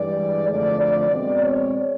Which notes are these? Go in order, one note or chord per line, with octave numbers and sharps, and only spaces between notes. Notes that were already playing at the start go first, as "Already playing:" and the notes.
Already playing: G2 E3 G#3 D5
F2 D3 F3 A3 D5
D5
B2 G#3 C4 D5
C#5